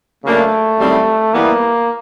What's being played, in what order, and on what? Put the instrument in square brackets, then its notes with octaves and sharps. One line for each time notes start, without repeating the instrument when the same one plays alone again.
[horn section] C#3 F#3 A#3 D4 [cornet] A3
[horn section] F#2 D#3 G3 C4 E4
[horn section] E3 G3 B3 E4 [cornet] A#3